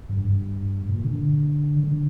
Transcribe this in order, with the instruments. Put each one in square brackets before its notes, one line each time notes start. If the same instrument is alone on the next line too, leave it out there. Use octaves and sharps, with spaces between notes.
[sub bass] G2
G2
A#2
D3
D3